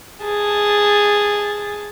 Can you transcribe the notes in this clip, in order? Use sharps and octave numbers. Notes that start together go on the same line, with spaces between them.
G#4 A5